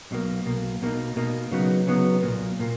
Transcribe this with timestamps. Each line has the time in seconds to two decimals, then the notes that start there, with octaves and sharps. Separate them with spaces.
0.11 B1 B2 A#3
0.46 B1 B2 A#3
0.82 B2 A#3 D#4
1.16 B2 A#3 D#4
1.51 C#3 F#3 B3 D#4
1.87 C#3 F#3 B3 D#4
2.23 B1 A#2 A#3
2.60 A#2 A#3